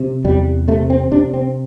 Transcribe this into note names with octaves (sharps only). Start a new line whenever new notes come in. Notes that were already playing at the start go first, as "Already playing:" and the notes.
Already playing: C3
E2 G3
C3 A3
C4
C3 D4
C4